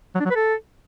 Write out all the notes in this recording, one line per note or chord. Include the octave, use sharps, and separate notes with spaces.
F#3
D4
F#3
B4
A4